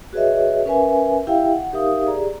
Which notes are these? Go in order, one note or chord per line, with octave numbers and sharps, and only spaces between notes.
F#4 G#4 B4 C#5 D#5 E5
C#4 A#4 B4 E5 G#5
E4 G4 E5 F5 G5
F#5
D#4 G4 A#4 E5 F5 D#6
G4 G#4 D5 A#5